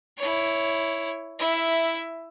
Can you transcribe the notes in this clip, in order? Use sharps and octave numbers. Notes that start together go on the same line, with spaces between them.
E4 C#5
E4 E5